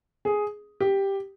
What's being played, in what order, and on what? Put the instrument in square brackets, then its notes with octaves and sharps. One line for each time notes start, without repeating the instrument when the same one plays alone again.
[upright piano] G#4
G4